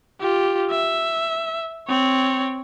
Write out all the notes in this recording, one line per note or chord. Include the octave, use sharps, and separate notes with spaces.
F4 G4
E5
C4 C#5